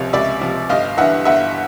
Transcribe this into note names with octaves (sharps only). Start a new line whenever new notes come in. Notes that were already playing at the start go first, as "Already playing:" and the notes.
Already playing: C#2 C3 F3 C#5
C#2 D5 E5
C3 F3
G1 D#5 F5
G2 E3 E5 F#5
G1 E5 F#5